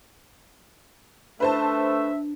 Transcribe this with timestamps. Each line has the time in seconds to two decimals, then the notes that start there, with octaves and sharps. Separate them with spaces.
1.40 A3 D4 B4 C5 E5 A5